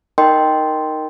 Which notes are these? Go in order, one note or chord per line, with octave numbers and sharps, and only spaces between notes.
D#4 A#4 D#5 G5 C6